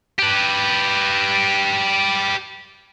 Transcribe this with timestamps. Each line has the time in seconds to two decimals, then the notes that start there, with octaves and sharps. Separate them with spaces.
0.19 G4 B4